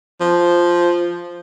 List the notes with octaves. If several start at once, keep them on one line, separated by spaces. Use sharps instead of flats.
F3